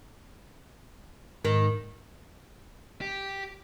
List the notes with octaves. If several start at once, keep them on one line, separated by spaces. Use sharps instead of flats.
G#2 D#3
G4